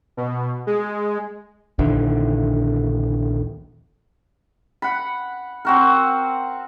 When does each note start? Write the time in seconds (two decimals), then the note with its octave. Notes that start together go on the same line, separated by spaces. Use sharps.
0.17 B2
0.67 G#3
1.79 A#1 D#2 D3 E3
4.82 F#5 B5
5.65 C4 F#4 A#4